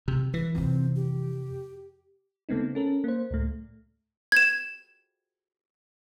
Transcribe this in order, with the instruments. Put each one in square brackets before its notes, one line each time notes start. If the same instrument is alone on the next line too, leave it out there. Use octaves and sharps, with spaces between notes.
[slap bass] C3
[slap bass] E3 [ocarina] B4
[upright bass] F2 C3 [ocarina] C4
[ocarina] G4
[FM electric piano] C#3 A3 B3 C4 D#4
C#4 A4 A#4
A#3 C5
C#2 A2 A3
[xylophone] G#6 E7